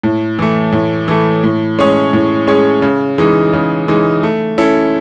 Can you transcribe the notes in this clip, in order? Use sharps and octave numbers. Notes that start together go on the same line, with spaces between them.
A2
E3 A3
A2
E3 A3
A2
G#3 C#4 G#4 C#5
A2
G#3 C#4 G#4 C#5
C#3
E3 G#3 D#4
C#3
E3 G#3 D#4
A3
C#4 E4 A4